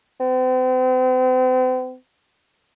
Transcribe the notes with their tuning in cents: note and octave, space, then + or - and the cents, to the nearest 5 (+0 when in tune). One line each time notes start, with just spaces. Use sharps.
C4 -40